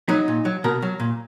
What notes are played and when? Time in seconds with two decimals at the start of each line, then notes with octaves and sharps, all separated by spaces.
0.09 F#3 D#4
0.28 A#2
0.45 F#3
0.64 B2 A#4
0.82 F#3
1.00 A#2